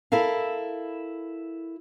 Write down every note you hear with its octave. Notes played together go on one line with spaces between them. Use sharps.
E4 A4 A#4 F5